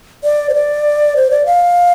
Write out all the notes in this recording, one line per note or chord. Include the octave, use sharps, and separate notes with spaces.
D5
C5
D5
C5
D5
F5